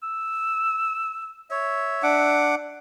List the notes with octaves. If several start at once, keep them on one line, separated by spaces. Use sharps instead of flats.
E6
C#5 E5
D4 F#5 D6